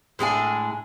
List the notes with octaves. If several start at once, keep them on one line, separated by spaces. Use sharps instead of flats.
A2 G#3 D4 G#5